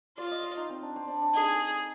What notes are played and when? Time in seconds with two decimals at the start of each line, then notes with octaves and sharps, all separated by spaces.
0.18 F4 D5
0.31 D#5
0.43 D5
0.57 D#4
0.69 C4
0.82 D4
0.96 C4
1.08 D4
1.22 D4
1.34 D#4 G#4